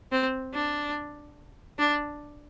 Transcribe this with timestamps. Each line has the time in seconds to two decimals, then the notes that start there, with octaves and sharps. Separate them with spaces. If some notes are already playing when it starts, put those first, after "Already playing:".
0.12 C4
0.54 D4
1.79 D4